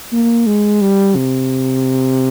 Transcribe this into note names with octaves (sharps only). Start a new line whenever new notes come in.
A#3
G#3
G3
C3